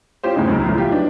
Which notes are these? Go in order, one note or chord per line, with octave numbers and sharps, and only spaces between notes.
C#4 F4 G4 C5
E2 A2 C#3 D#4
C#2 F#2 A2 C#3
B1 E3 F3 A3
E4 F4 G4
F#3 B3 D4 D#4